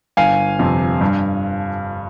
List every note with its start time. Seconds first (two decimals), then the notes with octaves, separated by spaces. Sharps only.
0.17 G1 F5 G#5
0.59 F2 C3
1.01 G2